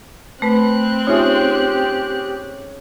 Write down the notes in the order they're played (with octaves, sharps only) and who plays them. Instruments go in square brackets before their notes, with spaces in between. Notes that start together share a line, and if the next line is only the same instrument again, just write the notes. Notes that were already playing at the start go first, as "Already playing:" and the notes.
[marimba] A3 B4 [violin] C4 F#6 [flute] B5
[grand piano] C#4 G#4 [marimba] D#4 F4 E5 [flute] G4